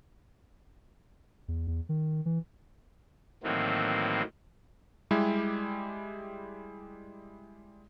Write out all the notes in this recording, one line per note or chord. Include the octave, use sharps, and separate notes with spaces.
E2
E2
D#3
E3
A2 D#3 E3 F#3 A#3 C4
G3 G#3 E4 G4